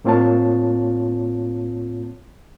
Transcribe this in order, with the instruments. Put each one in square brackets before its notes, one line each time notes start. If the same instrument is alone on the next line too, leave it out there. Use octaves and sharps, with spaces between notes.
[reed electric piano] A2 A#3 C4 F4 C#5 A5